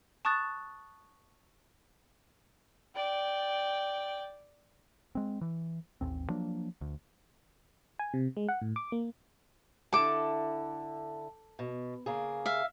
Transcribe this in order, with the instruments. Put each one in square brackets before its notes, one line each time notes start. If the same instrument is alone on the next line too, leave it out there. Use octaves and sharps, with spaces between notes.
[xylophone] A5 C#6 D#6 F#6 A6
[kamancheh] D5 G5
[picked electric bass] G#3 C4
E3
A1 D#2 C4
F3 F#3 A#3 D4
D2
[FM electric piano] G#5
C3
G#3
F#5
A2
D6
A#3
[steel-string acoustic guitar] D3 E4 A5 [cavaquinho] A4 D6
[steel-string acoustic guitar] B2
C#3 A#3 G#4
[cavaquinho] E5 F5